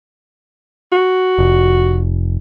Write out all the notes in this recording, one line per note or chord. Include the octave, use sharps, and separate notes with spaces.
F#4
F1